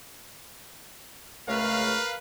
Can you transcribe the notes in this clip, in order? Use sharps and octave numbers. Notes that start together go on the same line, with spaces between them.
C#2 A3 A#4 B4 F5